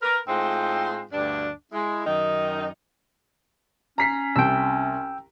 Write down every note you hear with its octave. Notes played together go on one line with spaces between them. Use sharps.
A#4 B4
A2 G#3 C4 D#4 F4 C5
D2 G2 D4
G#3 E4
F#2 D#3 D#4
C#4 A#5 B6 C7
C2 C3 G5 E6